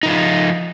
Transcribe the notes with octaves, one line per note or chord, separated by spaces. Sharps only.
F3 D#4 F4